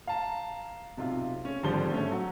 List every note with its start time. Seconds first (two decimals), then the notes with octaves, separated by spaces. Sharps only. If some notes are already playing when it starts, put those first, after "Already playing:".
0.07 F5 A5 A#5
0.97 B1 C3 F4
1.45 C#4
1.63 G#1 D3 F3 G3 C5 G7
1.91 A3 C#4
2.12 F#3